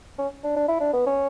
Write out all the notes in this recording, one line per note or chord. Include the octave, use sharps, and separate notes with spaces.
C#4
D4
D4
E4
D4
B3
C#4